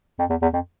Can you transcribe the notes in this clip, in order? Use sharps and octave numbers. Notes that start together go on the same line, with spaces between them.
F2
E2
E2
F2